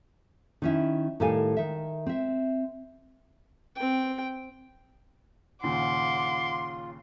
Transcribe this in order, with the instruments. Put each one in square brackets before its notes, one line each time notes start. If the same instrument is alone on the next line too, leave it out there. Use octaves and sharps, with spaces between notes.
[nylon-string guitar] D#3 C#4 E4
A2 D#3 G3 A4 F5 G#5
D#3 E5
C4 E5
[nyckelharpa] C4 G5
[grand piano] D#2 A#2 C#3 [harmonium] F4 [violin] F#5 D6 [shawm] C6